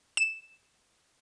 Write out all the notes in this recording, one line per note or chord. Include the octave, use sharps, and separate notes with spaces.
E7